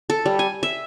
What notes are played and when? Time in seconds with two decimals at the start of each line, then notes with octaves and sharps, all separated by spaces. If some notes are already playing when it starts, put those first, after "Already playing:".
0.10 A4
0.26 G3
0.39 G#5
0.63 E5